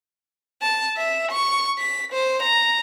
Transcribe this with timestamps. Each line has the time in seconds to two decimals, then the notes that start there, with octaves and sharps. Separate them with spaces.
0.62 A5
0.97 E5
1.31 C#6
1.79 B6
2.13 C5
2.42 A#5